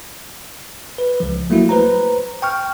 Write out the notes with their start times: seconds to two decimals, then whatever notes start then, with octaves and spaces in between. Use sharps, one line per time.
0.98 B4
1.20 C#2 F3
1.50 F#3 A3 A#3 E4 F#4
1.69 B4 C5 A#5
2.42 G5 C#6 F6